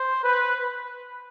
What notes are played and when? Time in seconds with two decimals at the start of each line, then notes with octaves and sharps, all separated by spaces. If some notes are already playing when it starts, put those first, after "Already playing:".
Already playing: C5
0.24 B4